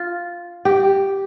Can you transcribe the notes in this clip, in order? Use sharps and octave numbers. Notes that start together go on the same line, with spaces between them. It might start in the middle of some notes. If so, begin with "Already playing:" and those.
Already playing: F4
G4